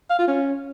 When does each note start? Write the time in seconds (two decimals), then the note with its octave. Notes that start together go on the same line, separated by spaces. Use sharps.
0.10 F5
0.19 F4
0.28 C#4